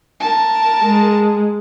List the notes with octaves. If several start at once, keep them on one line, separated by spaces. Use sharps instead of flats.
A#4 A5
G#3